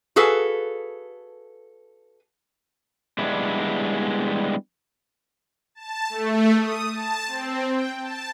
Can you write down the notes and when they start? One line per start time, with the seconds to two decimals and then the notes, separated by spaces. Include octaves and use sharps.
0.16 F#4 G#4 A4 B4 F5
3.18 G3 G#3 B3 D4 E4
5.75 A5
6.09 A3
6.58 D#6
6.89 A5
7.27 C4
7.69 G5
8.01 A5